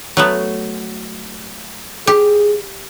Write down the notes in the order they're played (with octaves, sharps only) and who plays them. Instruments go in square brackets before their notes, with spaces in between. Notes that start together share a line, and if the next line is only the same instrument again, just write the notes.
[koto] F#3 A3 B3
[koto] G4 [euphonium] G#4